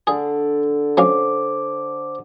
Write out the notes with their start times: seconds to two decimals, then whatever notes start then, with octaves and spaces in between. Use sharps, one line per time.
0.07 D3 G#4
0.97 F#3 C#4 C5 F5 D6